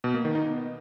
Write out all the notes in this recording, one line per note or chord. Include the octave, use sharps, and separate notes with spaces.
B2
A#3
D#3
D#4
B3